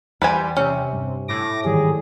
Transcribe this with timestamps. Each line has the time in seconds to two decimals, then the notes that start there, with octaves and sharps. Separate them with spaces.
0.22 E2 G3 B4 C5 G#5
0.57 C3 C#4
0.93 G2
1.28 A2 D6 A#6
1.65 G#2 D#3 E3 G3 G#4